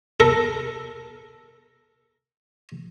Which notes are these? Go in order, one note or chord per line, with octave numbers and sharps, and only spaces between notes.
A4 A#4